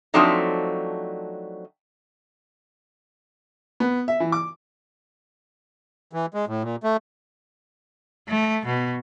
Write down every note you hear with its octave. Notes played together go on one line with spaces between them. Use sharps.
F3 F#3 A3 C4 D4 D#4
B3
E5
E3
D6
E3
G#3
A2
A#2
A3
A3
B2